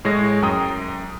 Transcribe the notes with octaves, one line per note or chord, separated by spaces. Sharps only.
A2 G#3 C#5 A#6
F#2 G5 A#5 D#6